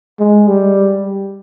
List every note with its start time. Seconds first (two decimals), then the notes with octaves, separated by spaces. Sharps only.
0.19 G#3
0.47 G3